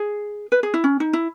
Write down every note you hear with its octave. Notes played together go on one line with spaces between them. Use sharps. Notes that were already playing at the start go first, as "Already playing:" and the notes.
Already playing: G#4
B4
G#4
E4
C#4
D#4
E4